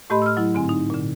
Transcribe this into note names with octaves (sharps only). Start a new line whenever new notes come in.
A2 A3 G4 D#5 B5 C6
E6 F6
F#3 E4
G#2 D3 C4 G#5
D#4
A#2 D3